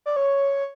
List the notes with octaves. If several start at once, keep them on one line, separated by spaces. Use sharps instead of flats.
D5
C#5